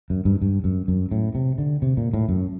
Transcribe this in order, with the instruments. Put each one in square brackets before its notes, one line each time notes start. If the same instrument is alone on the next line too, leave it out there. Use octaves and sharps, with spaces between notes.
[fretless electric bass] F#2
G2
G2
F#2
F#2
A2
C3
D3
C3
A#2
A2
F#2